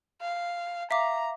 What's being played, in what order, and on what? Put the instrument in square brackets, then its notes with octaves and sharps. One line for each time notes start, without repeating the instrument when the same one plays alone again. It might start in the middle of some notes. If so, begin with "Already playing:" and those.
[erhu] F5
[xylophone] E5 F5 D6 [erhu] A#5